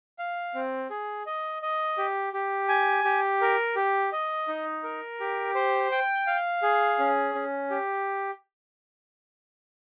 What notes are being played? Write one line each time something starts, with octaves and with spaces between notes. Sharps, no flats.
F5
C4
G#4
D#5
D#5
G4
G4
G#5
G4
A#4
G4
D#5
D#4
A#4
G4
C5
G5
F5
G#4
C#4
C#4
G4